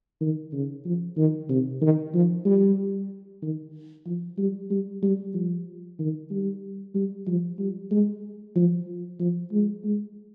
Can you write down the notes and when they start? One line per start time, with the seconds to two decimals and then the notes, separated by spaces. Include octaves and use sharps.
0.21 D#3
0.53 C#3
0.85 F3
1.17 D#3
1.49 C3
1.82 D#3
2.14 F3
2.45 G3
3.42 D#3
4.06 F3
4.38 G3
4.70 G3
5.02 G3
5.34 F3
5.99 D#3
6.31 G3
6.95 G3
7.27 F3
7.59 G3
7.91 G#3
8.56 F3
9.20 F3
9.52 G#3
9.84 G#3